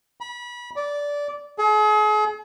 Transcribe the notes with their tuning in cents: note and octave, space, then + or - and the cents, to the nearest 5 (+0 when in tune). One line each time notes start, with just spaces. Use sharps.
B5 -30
D5 -15
G#4 +40